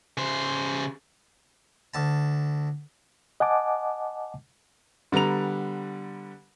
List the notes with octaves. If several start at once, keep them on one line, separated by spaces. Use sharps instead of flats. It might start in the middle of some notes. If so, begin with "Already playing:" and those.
C#3 C5
D2 A5
D#5 F#5 G#5 A5 D6
D3 G3 B3 A#5 F7